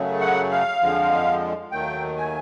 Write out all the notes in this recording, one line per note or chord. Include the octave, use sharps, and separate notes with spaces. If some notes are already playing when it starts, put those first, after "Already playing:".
Already playing: F#2 C#3 F#3 A3
F#5
F5
F2 D3 F3 G#3
D#2 D#3 F#3 A3 G5
G#5